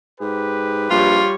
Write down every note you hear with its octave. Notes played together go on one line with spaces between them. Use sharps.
G#2 G4 B4
A#1 G3 F4 C#5